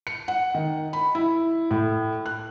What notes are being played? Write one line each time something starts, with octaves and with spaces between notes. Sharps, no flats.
C#7
F#5
D#3
B5
E4
A2
F#6